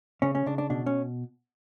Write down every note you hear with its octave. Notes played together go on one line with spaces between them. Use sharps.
C#3 C#4
C#4
C#3 D4
D4
B2 D4
C#4